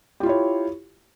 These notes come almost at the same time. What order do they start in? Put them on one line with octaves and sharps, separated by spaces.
G4 F4 E4 C#5